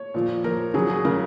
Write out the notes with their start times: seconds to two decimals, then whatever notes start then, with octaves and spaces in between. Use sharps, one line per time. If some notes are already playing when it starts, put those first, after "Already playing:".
Already playing: C#5
0.14 A#2 F3
0.44 A#2 F3 A#4
0.74 C#3 F#3 G#4
0.90 G#4
1.05 C#3 F#3 A#4